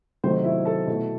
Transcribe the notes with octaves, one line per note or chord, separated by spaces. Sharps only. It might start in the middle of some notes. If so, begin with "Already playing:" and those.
C3 D#3 F#3 A3 C5
E4 E5
A4 A5
B2 A3 E4